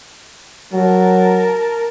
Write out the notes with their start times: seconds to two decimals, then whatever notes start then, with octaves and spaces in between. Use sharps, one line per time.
0.73 F#3 A#4 A5